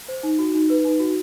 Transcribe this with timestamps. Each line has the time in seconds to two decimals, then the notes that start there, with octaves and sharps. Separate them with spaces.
0.08 C5
0.23 D#4
0.39 F#4
0.54 D#4
0.70 B4
0.85 D#4
1.00 F#4